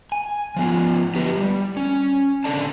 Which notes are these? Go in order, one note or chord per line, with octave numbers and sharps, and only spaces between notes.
G#5
F3 B3 F4
B3 E4 G4 B4
G3
C#4
C#3 C4 D4 A4 D5 A5